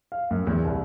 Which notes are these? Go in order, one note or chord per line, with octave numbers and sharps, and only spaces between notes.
F5
F#2
E2
C2